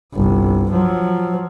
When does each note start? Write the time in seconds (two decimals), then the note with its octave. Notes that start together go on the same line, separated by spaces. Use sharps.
0.15 G1 C2
0.72 F3 F#3